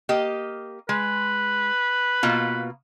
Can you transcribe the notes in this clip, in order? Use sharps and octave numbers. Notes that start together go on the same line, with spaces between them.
A#3 G4 D#5
G#3 B4
B2 A#3 F4